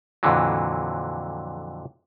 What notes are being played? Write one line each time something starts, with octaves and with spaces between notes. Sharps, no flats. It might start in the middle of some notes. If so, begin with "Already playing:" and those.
F2 A#2 D3 E3 F#3